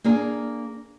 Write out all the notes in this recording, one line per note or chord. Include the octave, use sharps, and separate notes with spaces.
A#3 D4 G#4 A#4